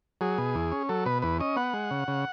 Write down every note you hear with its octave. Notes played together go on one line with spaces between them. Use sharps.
F#3 G#4
B2
E2
C#4
F#3 A4
B2 B4
E2 B4
C#4 D#5
B3 F#5
G#3
C#3
C#3